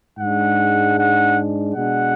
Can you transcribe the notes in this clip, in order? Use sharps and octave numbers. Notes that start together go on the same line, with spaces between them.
G#2 G#3 D4 F#5
F#5
B2 G#3 D4 F#5